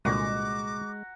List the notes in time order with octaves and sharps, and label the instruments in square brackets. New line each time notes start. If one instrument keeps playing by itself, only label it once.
[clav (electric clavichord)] C2 A#2 D3 [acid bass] G#3 [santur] F#4 A#5 [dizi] D6